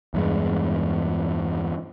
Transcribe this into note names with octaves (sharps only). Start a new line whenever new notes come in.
E2 G2 G#3